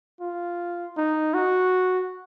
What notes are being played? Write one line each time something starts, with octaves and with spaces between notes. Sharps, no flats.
F4
D#4
F#4